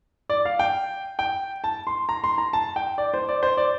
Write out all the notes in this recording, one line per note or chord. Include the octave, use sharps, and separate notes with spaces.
D5
F5
G5
G5
A5
C6
A#5
C6
A#5
A5
G5
D5
C5
D5
C5
D5